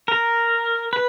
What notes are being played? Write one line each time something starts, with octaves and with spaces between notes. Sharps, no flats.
A#4
B4